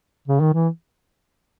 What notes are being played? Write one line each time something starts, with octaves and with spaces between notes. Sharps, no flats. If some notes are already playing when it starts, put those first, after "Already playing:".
C#3
D#3
E3